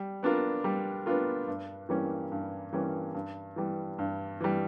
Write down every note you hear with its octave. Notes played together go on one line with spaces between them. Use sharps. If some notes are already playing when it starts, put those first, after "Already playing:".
Already playing: G3
B3 D4 F4 A#4
G3
B3 D4 F4 A#4
G2
E3 G3 A#3 C#4
G2
E3 G3 A#3 C#4
G2
E3 G3
G2
E3 G3